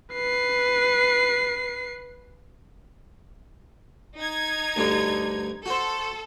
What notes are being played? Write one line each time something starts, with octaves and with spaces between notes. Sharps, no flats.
B4 C7
D#4 G#6
D2 G2 D3
F#4 A4 C5